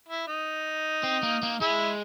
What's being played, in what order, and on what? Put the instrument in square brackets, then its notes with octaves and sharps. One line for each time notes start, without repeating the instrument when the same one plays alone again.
[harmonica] E4
D#4
[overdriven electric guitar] C4
A#3
A#3
[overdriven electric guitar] G#3 [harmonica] E4